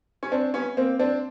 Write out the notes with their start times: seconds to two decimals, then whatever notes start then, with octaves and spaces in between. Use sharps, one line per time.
0.23 C#4
0.32 C4 D4
0.54 B3 C#4
0.77 A#3 C4
0.99 C4 D4